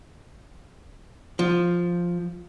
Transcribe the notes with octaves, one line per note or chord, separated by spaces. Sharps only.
F3